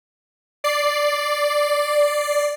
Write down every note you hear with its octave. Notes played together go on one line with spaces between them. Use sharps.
D5 C7